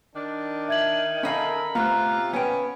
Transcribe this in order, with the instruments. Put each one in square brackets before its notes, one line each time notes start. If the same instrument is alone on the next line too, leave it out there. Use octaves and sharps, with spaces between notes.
[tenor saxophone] D#3 [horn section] D4
[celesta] E5 G#6 F#7
[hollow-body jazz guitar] C#4 D#5 F5 [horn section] A4 A#4 B5
[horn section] C3 [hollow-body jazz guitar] A3 B3 [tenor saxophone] F4 [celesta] A#5 F#6
[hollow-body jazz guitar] B3 G5 [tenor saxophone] C#4 [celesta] B4 G#5